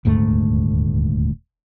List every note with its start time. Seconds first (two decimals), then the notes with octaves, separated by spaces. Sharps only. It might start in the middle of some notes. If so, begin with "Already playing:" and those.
0.05 D#1 D2 G#2 A3